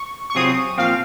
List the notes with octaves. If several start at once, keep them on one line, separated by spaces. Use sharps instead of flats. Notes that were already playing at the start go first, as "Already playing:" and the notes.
Already playing: C#6
C#6
C3 F#3 C4 F4 G#4 D#6
A#2 F3 C4 F5